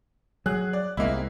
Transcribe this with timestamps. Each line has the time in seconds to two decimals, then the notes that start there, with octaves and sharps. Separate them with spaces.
0.46 F#3 G#4 F#6
0.73 D5
0.97 C2 G#3 A#3 C4 D#4 E4